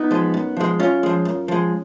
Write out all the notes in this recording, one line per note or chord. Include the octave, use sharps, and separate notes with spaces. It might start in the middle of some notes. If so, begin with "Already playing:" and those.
Already playing: B3 D#4
F3 G#3
F#2
F3 G#3
F#2 C#4 F4
F3 G#3
F#2
F3 G#3